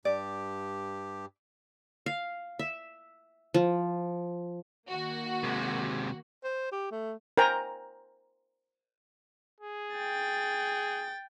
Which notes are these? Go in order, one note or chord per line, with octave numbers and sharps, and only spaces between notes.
G2 G4 D5
F5
E5
F3
D#3 A#3 F#4
C3 G#3
C5
G4
A3
A#4 C5 G5 G#5 A#5
G#4
G5 A6